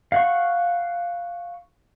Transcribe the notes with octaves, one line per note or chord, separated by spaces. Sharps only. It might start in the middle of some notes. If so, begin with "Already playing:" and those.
F5 F#5 C#6